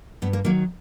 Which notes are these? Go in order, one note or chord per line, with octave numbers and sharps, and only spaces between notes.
G2 B3
A#3
D#3 F#3 A#3